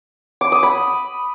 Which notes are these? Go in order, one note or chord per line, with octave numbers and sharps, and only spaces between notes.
D6
D#6
B5